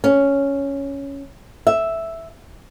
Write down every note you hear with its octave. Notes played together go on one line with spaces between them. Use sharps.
C#4
E5